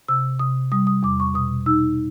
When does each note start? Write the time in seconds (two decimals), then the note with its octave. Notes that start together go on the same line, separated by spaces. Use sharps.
0.08 C3 E6
0.39 C3 D#6
0.72 G3 D#6
0.87 D#6
1.03 E2 D6
1.20 C#6
1.34 B2 D#6
1.66 D#4 E6